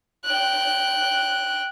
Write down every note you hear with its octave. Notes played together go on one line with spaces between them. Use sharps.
G5 F#6